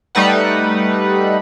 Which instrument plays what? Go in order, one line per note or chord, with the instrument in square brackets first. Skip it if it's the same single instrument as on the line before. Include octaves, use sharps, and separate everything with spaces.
[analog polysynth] G3 A3 D#4 B4 F#5